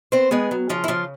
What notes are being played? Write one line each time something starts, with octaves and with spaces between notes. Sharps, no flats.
B3 C4 C5
G#3 B3 G#4
F#3
C#3 F3 F4
E4
C#3 F3 F4